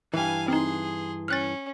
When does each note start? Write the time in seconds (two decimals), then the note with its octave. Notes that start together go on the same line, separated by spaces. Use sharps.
0.14 G2 E3 F5 G#5
0.48 C4 D#4 G#4 C6
1.28 C#4 F6 F#6 A6